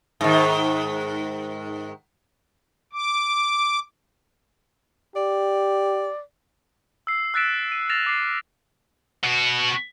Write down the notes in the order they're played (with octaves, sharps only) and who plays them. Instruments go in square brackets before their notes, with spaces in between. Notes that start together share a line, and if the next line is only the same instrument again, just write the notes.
[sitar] G#2 D#3
[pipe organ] D6
[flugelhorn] G4 [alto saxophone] D5
[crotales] E6 C7
E6 F#6 A6 B6 D7 E7
D#7
F6 A6 A#6 C7 E7 F7
D6 C7
[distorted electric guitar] B2 F#4